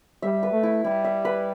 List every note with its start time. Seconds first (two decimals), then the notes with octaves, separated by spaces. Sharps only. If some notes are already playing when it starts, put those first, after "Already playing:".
0.22 G3 E5
0.43 B4
0.53 A3
0.63 E4
0.83 G3 E4
1.05 E5
1.25 B4